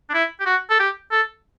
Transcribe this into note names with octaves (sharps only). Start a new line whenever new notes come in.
D4
E4
G4
F#4
A4
G4
A4